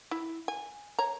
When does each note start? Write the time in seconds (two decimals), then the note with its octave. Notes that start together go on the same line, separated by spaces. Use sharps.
0.11 E4
0.48 G#5
0.99 C#5 A#5